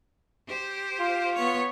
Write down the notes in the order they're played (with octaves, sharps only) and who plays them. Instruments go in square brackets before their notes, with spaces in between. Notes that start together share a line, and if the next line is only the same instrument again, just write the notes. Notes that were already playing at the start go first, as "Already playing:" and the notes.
[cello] G4 C5
[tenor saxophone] F4
[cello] B3 C#5